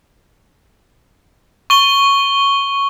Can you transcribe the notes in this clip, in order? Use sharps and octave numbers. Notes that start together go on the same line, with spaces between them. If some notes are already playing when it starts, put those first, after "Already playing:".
C#6 G7